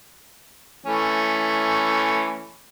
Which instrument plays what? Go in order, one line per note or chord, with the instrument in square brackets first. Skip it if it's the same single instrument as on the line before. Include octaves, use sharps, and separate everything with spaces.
[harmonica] E3 A3 C#4